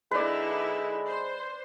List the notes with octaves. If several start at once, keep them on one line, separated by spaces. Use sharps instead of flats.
D3 G#3 D#4 E4 B4 D5
C5